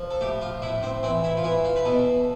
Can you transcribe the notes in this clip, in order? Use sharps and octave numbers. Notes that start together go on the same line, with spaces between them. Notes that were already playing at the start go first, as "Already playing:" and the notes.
Already playing: F3
A4
A2 G4
F4
A2 E4
C4
E3 C4
E4
F4
E3 E4
F4
B4
B2 A4